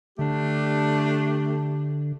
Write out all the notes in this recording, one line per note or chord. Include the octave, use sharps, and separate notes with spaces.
D3 A3 D4 G4